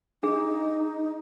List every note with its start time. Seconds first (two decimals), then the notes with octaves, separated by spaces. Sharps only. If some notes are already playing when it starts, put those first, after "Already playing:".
0.23 D4 D#4 G#4